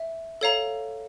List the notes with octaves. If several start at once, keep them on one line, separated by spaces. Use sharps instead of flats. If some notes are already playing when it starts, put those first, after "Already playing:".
Already playing: E5
A4 C#5 F5 A#5